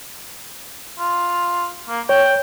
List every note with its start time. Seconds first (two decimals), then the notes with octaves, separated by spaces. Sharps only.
0.99 F4
1.89 A#3
2.09 C#5 G5